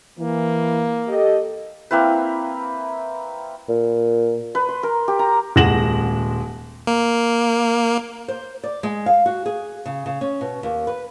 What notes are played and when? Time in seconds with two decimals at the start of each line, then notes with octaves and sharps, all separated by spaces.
0.19 E3 A#3
1.08 G4 A4 D#5
1.91 A#3 C4 E4 B4
3.69 A#2
4.55 B4
4.69 C6
4.83 A#4
5.08 G4
5.19 A#5
5.56 D#1 G#3 F#5 A#6 E7 F#7
6.87 A#3
8.28 C5
8.64 D5
8.83 G#3
9.06 F5
9.26 F#4
9.46 G#4
9.86 C#3
10.06 C#3
10.21 C#4
10.41 B2
10.63 D#2
10.87 B4